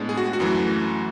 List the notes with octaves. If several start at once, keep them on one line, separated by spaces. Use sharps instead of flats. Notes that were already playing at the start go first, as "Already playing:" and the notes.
Already playing: A2 G#3 B3 D4
G#4
F#4
F#4
F#2 E3 A3